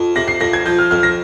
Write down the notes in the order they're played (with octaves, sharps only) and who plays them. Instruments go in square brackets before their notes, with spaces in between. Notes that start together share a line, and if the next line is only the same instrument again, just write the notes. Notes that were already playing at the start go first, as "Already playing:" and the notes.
Already playing: [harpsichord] F2
[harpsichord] C3 [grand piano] A#6
[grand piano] C7
[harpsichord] F2 [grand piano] A#6
[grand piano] G#6
[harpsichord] F3 [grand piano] G6
[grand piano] F6
[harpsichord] F2 [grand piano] F6
[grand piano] A#6